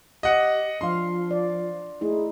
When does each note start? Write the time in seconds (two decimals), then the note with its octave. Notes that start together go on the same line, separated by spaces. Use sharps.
0.23 G4 D#5 F#5
0.81 F3 D4 F4 F5 C6
1.31 D5
2.01 A3 D#4 E4 G#4